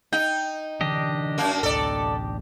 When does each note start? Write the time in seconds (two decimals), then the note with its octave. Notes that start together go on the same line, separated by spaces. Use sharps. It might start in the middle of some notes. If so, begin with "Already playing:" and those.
0.13 D#4 G5
0.81 D3 E3 D4 G4 D#5
1.38 F#2 A#3
1.63 A1 D2 A2 A4 D5